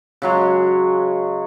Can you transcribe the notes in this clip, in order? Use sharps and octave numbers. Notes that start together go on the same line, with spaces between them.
C#3 F#3 G#3